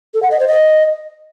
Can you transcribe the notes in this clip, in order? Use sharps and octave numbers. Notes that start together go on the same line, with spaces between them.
A4
F#5
D#5
C5
D#5